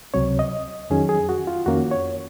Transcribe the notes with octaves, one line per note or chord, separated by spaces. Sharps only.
C#2 C3 F#3 C4 C#5
D#5
F2 D#3 F#3 C#4 G#4
G#4
F#4
F4
F2 D#3 A#3 C#4 F#4
C#5